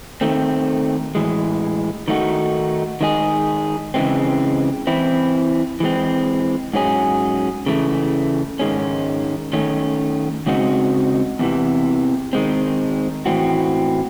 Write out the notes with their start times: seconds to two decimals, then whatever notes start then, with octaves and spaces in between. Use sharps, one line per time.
0.21 D#3 A3 C4
1.15 A2 E3 G#3
2.08 D#3 A3 D#4 F#4
3.01 D#3 G#3 D#4 G#4
3.94 C#3 E3 G#3 C4
4.87 E3 C4 E4
5.80 E3 G#3 C4
6.73 G#2 F#3 C#4 G#4
7.66 C#3 E3 A3
8.60 G#2 D#3 G#3 C#4
9.53 D#3 A3 C#4
10.46 C#3 G#3 C4 D#4 F#4
11.39 E2 C3 E3
12.33 D#3 G#3 C4
13.26 A2 E3 C4 F#4